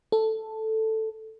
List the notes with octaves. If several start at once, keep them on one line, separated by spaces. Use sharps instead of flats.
A4